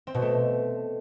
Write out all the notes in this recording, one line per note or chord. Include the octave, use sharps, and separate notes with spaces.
C4
B2
A3